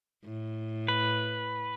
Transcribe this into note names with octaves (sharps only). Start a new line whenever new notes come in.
A2
B4